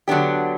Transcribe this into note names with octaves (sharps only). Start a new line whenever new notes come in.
D3 F#3 B3 D4 G4